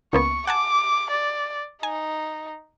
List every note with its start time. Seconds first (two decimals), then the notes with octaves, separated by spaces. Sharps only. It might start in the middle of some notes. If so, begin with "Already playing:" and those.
0.13 C#2 A#3 B3 C#6
0.47 F#5 G#5 A5 D6
1.11 D5
1.83 D#4 G#5